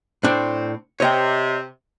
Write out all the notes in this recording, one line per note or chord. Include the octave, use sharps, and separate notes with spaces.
A2 C4 D4
C3 C#5 D#5 G5